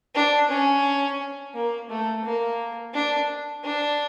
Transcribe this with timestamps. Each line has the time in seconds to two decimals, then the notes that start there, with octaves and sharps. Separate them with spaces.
0.15 D4
0.49 C#4
1.54 A#3
1.89 A3
2.24 A#3
2.94 D4
3.64 D4